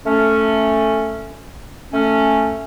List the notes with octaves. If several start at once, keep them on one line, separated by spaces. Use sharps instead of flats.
A3 C#4
A3 C#4